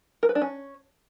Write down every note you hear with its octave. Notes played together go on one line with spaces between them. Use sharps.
A#4
B4
D4
C#4